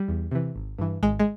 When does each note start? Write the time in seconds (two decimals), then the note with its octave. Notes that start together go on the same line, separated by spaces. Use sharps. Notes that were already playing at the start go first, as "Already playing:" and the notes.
Already playing: G3
0.08 E2
0.31 C3 E3
0.56 G#1
0.78 G2 E3
1.03 G#1 G#3
1.19 G#3